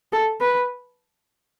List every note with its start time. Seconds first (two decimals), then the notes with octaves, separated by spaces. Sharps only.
0.12 A4
0.40 B4